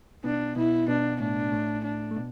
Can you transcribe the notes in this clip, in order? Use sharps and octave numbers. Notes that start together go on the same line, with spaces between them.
B2 B3 D4
B2 B3 E4
B2 B3 D4
A2 A3 D4
A2 A3
D4
A3
B2 B3